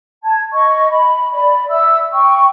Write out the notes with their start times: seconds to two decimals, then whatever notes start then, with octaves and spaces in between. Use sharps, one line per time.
0.23 A5 G#6
0.52 D#5 C#6
0.89 B5
1.33 D5 B5
1.68 E5 E6
2.12 G5 C#6